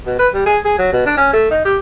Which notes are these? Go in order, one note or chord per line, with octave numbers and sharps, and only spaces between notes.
B2
B4
G3
G#4
G#4
F#3
B2
D4
C#4
A3
D#4
G4